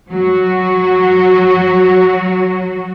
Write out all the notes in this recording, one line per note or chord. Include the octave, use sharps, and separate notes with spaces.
F#3 F#4